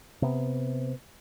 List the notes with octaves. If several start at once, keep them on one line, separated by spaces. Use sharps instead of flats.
C3 B3